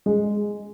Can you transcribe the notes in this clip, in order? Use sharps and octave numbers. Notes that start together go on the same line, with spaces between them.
G#3